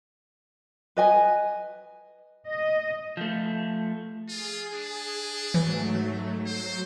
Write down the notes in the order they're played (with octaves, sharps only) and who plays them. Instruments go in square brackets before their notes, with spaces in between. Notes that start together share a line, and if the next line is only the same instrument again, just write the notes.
[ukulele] B4 D#5 G#5
[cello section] D#5
[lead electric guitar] F3 A3
[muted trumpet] F4 [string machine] G#4
[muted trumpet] D4
[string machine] G#2 F#3 A3 [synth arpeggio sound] E3
[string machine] F#3 [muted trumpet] C5